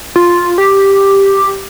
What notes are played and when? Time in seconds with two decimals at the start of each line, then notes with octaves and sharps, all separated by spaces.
0.16 F4
0.58 G4